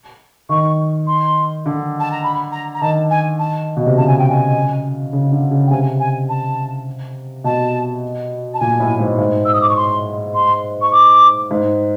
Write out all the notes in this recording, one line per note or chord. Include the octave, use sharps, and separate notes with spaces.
D#3 C#6
C6
D3
A5
A#5
B5
A#5
A#5
D#3 A5
G#5
A5
B2
C3
C#3 A5
G#5
G5
G#5
C#3
D3
C#3
G5
C3 G#5
G#5
A5
B2 A5
A5
A#2 G#5
A2
G#2
G#2
E6
D#6
D6
C#6
C6
C6
C#6
D6
G#2